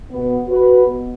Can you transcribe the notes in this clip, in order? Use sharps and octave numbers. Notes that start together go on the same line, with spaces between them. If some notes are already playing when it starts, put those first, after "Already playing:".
B2 B3
F#4 B4
B2